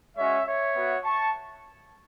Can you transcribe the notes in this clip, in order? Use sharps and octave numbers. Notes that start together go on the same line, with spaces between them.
G#3 C#4 F#4 C#5 E5
C#5 E5
B3 F#4
A5 C#6